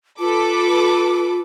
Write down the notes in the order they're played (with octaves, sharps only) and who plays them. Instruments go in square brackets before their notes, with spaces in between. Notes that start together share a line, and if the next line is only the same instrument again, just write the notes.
[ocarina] F4 [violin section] A4 B4 D6